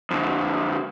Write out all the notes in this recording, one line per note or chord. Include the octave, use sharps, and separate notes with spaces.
F2 D3